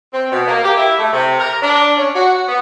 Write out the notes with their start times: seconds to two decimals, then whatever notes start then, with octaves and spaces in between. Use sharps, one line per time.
0.13 C4
0.32 B2
0.47 A#3
0.63 G4
0.77 E4
0.99 A3
1.12 C3
1.39 A#4
1.61 D4
1.96 C#4
2.14 F#4
2.47 B3